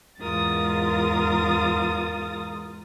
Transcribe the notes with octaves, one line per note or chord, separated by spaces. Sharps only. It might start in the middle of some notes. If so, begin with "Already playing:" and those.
E2 G#2 F4 A#4 D#6 A6